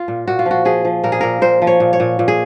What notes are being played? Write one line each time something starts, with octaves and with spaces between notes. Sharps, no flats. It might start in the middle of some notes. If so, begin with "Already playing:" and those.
Already playing: F4
A#2
A#2 F#4
F4
F3
F#4
F3 G#4
F3
A#2 A#4
G#4
A#2 A#4
A#2 C5
F3
C#5
A#2
C#5
A#2
A#2
G#4